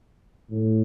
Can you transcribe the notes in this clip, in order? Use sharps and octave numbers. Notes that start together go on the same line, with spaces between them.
A2